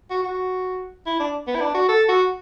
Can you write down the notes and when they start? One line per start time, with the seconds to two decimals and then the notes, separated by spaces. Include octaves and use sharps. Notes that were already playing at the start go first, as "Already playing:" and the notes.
0.10 F#4
0.23 F#4
1.06 E4
1.20 D4
1.47 B3
1.55 E4
1.61 D4
1.74 F#4
1.89 A4
2.08 F#4